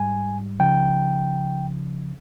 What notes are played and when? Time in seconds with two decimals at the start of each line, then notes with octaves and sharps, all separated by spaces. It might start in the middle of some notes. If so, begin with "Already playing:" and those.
Already playing: G#2 G3 G#5
0.60 C#2 C#3 F3 G5